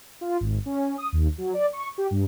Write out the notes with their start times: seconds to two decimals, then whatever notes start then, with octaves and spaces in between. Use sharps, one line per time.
0.21 F4
0.40 G#1
0.66 C#4
0.98 D#6
1.12 D#2
1.38 F#3
1.54 D5
1.73 C#6
1.98 G4
2.11 G2